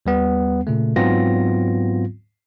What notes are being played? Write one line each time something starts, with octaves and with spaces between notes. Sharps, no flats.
D#2 G3 B3
A#2 C#3 A3
G#2 F#3 B3 C4 F4 A#6